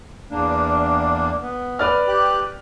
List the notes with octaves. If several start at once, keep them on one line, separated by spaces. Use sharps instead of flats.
E2 A#3 D4
B3
B4 D5 F6
G4 F#6